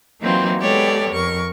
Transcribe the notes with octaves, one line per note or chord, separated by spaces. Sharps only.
E3 F#3 A#3 C4 D#4 F4
G#3 B3 G4 A4 C#5 D5
F2 A#4 C#6